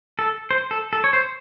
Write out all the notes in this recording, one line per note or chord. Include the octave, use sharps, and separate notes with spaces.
A4
C5
A4
A4
C#5
C5